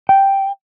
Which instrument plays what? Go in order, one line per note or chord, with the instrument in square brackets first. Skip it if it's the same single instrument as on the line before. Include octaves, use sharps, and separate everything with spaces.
[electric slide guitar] G5